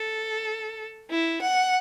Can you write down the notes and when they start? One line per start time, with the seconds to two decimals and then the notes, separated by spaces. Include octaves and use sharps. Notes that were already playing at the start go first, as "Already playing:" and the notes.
Already playing: A4
1.11 E4
1.42 F#5